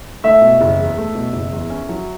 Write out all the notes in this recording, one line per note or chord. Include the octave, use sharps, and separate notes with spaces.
A3 E5
B2
F#1
E2
A3
B2
F#1
E2
C#4
F#3